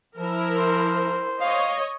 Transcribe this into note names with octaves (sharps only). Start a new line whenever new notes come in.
F3 E4 A#4
C5
C#5 D#5 F5